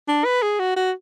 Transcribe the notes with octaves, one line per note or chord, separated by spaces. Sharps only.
D4
B4
G#4
F#4
F#4